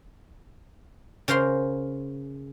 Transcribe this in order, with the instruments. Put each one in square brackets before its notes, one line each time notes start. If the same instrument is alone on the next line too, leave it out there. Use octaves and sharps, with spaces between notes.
[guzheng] C#3 A#4 C5 F5 C6